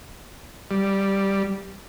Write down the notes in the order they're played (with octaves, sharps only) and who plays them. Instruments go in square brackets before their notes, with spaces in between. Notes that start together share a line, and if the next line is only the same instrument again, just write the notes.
[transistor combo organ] G3